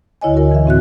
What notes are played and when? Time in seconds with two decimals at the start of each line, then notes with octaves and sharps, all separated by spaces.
0.21 D2 D3 E4 C#5 D#5 G#5
0.34 F#4 A#4
0.51 E3 E5
0.66 A2 C4 F#4 F#6